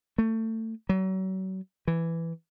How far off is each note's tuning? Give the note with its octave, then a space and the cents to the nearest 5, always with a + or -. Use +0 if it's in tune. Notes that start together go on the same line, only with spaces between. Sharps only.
A3 +25
F#3 +35
E3 +10